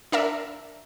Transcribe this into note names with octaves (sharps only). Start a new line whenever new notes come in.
D4 A#4 E5